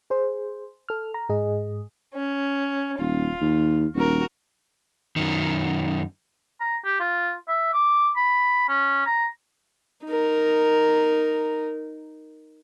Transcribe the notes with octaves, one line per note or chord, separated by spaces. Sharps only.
G#4 C5
A4 F6
A#5
G#2 G#4 D#5
C#4
D#1 F4
D#2
D#1 F#4 A#4
F#2 D#3
A#5
G4
F4
E5
D6
B5
C#4
A#5
D#4 A#4